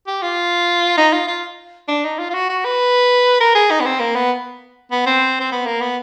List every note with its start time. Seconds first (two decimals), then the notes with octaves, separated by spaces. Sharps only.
0.07 G4
0.22 F4
0.97 D#4
1.13 F4
1.28 F4
1.88 D4
2.04 D#4
2.19 F4
2.30 F4
2.34 F#4
2.50 F#4
2.65 B4
3.40 A#4
3.55 G#4
3.71 D#4
3.80 B3
3.85 C4
4.00 A#3
4.15 B3
4.91 B3
5.06 C4
5.40 C4
5.52 B3
5.66 A#3
5.81 B3